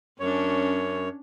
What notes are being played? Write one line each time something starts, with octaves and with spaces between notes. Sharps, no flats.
F#2 C#4 D4 C#5